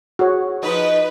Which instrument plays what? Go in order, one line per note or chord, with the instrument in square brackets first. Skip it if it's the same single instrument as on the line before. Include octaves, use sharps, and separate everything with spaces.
[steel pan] F#4 G#4 C#5
[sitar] F3 D#4 [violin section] B4